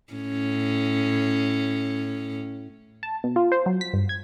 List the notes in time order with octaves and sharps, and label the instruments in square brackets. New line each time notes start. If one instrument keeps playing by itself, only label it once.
[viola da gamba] A2 C#4
[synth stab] A5
B2
F4
C5
F#3
B6
G2
G#6